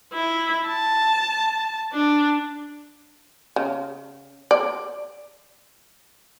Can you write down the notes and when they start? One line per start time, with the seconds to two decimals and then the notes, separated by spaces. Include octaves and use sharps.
0.13 E4
0.66 A5
1.93 D4
3.56 C#3
4.51 D5